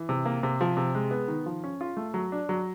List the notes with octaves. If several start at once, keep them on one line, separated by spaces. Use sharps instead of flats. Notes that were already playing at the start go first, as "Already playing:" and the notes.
Already playing: E3
C3
A#3
C3
F3
C3
G#3
B3
D#3
F3
C#4
F4
A3
F#3
D4
F#3